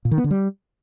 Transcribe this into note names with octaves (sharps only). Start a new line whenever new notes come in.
A#2
D#3
B3
D3
G3